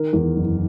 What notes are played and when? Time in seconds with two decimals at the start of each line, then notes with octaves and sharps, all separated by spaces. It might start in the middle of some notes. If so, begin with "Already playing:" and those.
Already playing: D#3 A#4
0.13 E2
0.36 F#1